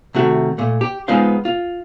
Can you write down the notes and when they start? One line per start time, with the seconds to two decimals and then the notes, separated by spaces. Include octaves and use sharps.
0.15 C3 D#3 A3 F#4
0.58 A#2 A3
0.81 G4
1.08 G#3 B3 D#4 F4 C5 F5
1.45 F4